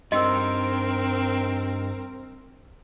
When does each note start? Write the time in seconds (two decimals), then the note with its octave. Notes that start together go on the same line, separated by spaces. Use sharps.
0.12 G2 C4 D#4 A#4 D#5 C6 E6